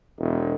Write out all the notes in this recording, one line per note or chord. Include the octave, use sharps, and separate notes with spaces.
E1